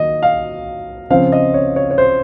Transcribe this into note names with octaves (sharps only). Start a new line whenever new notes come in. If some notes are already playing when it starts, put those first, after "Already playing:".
Already playing: D#3 F#3 A#3 D#5
F5
C#3 F3 C4 F5
D#5
C#5
C#5
C#5
C5